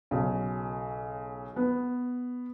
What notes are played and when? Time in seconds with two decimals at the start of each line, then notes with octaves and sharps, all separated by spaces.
0.11 B1 C#3
1.56 B3